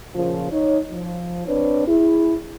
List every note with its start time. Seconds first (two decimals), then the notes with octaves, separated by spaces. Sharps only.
0.15 A#2 C#3 F3
0.52 D#4 C#5
0.91 F3
1.47 C4 D4 B4 C#5
1.87 E4 G#4